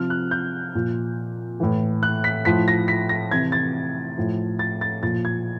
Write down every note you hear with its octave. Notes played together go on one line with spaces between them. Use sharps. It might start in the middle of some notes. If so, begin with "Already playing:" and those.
Already playing: C3 F3 F6
F#6
G6
A#2 F3
A2 E3
F#6
B6
A2 F3 B6
A#6
B6
A#6
C3 E3 G#6
A6
A2 F3
A6
A6
A#2 F3 A6
G#6